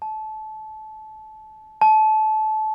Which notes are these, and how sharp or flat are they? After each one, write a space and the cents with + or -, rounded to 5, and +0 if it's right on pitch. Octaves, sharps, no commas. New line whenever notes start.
A5 -25
A5 -25